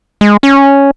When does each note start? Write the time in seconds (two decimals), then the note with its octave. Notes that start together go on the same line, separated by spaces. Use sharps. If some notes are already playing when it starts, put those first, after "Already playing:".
0.21 G#3
0.43 C#4